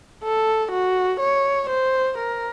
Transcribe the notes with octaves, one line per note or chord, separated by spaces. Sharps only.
A4
F#4
C#5
C5
A#4